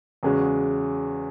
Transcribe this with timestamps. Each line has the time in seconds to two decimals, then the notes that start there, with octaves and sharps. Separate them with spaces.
0.23 E2 C#3 G#3 C#4 F#4